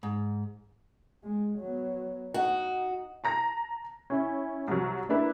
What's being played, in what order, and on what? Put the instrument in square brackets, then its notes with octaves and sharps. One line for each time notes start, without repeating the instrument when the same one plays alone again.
[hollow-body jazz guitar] G#2
[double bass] G#3
F#3 B3
[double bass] D#4 [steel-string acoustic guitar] F#4
[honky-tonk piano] A5 A#5 A#6
C#4 E4
C2 F#3
A#3 D4 E4 B4